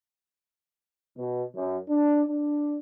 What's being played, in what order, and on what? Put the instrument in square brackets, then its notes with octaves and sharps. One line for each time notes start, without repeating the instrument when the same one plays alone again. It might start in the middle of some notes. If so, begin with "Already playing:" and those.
[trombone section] B2
F#2
D4
D4